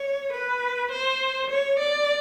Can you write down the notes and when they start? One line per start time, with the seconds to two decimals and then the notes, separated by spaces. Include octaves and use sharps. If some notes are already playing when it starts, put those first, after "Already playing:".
Already playing: C#5
0.33 B4
0.92 C5
1.50 C#5
1.79 D5